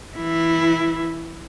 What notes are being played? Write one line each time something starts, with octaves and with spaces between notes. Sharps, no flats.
E3 E4